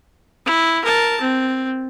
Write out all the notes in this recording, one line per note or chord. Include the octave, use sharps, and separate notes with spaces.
E4
A#4 A5
C4